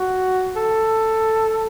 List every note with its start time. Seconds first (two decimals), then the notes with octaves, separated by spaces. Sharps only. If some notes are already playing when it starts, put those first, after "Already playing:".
Already playing: F#4
0.56 A4